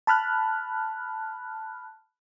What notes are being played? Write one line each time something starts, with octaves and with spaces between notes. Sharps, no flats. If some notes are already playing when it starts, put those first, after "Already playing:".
A5 B5 F6 F#6